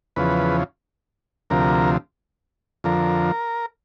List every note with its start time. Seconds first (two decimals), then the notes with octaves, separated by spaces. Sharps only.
0.16 E2 C#3 F3 B4
1.50 D2 C3 F3 A#4
2.84 F2 D3 F3 A#4